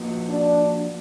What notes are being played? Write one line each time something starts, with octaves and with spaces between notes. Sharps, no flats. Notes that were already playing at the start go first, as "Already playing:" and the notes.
Already playing: F3 A#3 D#4 F#4 B4
D4